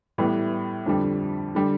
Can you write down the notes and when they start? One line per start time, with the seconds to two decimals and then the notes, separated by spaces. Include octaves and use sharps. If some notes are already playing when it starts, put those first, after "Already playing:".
0.18 A2 E3 G3 B3
0.86 F2 D3 G3
1.55 D3 G3